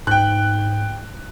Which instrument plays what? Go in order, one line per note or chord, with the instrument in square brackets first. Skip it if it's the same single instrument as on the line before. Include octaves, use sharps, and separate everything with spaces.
[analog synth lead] G#2 [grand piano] G5 F#6